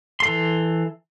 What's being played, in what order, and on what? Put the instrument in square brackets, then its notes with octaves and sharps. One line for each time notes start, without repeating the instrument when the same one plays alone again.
[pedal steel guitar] E3 A4 C6